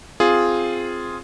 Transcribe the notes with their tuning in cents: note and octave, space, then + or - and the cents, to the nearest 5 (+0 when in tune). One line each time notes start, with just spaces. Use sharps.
C4 +0 F4 +0 G#4 +0